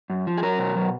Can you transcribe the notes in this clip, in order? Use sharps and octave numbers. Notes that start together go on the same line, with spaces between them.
F#2
F3
G#4
F#3 A#4
B2
F#3